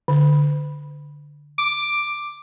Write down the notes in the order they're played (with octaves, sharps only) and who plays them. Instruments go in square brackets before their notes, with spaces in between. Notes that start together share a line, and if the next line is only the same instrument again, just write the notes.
[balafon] D3
[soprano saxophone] D6